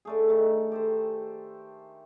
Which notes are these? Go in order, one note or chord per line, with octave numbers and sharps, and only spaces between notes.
D3 A3 G#4
D#3 A3
G4 A4 C5